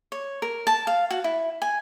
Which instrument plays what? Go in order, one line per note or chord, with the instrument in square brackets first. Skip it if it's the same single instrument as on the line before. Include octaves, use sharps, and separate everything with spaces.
[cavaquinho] C#5
A#4
A5
F5
F#4
E4
G#5